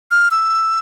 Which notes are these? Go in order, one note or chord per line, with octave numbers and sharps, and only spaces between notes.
F6
E6